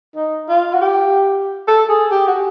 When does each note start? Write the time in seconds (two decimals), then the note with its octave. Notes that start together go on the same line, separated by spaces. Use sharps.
0.16 D#4
0.49 F4
0.73 F#4
0.81 G4
1.68 A4
1.89 G#4
2.11 G4
2.27 F#4